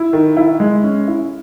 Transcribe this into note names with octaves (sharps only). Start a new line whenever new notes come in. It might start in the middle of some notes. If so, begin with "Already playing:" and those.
Already playing: E4
D#3
E4
G#3
C#4
E4